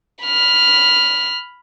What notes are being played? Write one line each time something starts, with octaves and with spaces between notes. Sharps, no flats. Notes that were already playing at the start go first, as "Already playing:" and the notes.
B5 F6